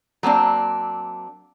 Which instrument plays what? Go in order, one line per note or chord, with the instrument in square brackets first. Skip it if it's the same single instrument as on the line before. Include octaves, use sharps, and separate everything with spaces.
[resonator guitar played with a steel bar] F#3 A#3 C4 D4